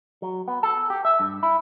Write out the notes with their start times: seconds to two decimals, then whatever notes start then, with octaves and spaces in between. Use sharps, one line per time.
0.22 F#3
0.48 B3
0.63 A4
0.90 G4
1.05 E5
1.20 G2
1.43 E4